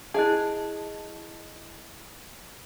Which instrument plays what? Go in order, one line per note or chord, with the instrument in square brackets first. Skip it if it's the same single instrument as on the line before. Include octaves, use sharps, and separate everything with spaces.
[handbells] E4 D#5 A5 [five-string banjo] G#4